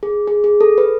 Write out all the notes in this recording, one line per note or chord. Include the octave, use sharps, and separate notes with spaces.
G#4
G#4
G#4
A4
B4